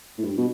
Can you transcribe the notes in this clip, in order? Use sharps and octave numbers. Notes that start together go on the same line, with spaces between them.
A2
G2
B2